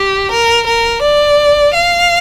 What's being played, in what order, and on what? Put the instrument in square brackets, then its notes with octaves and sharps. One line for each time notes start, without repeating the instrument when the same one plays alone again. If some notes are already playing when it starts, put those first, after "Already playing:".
Already playing: [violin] G4
A#4
A#4
D5
F5